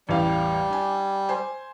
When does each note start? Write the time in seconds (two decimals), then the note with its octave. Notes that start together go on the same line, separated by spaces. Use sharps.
0.09 A1 E2 G3 F5
0.70 D4 G#5
1.29 C5 G#5